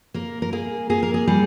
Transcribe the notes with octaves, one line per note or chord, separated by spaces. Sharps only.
A#3 A#4
A#4
A#3 G#4
A#3 G#4
A#4
G#4
G3 G#4